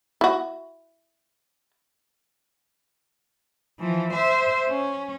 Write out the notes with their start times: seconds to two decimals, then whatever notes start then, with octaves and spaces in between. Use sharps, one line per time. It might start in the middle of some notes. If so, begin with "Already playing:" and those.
0.21 E4 F#4
3.80 E3 F3
4.13 C5 E5
4.68 C#4